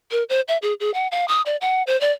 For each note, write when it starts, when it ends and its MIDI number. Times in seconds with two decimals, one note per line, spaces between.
0.11 0.23 70
0.29 0.41 72
0.48 0.57 76
0.62 0.73 68
0.80 0.93 68
0.94 1.07 78
1.12 1.25 77
1.28 1.42 87
1.46 1.56 74
1.61 1.83 78
1.87 1.99 72
2.01 2.12 74